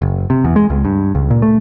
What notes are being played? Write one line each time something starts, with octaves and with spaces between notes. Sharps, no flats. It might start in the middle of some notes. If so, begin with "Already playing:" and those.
F#1
C3
E2
G#3
C#2
G2
C#2
A#2
A3